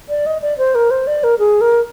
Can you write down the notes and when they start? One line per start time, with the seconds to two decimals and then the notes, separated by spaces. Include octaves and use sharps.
0.09 D5
0.26 D#5
0.42 D5
0.58 C5
0.75 A#4
0.91 C5
1.07 D5
1.24 A#4
1.39 G#4
1.61 A#4